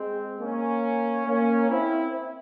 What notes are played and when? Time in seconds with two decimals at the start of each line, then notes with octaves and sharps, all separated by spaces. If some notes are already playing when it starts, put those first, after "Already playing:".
Already playing: G#3 C4
0.40 A#3 C#4
1.26 A#3 C#4
1.69 C4 E4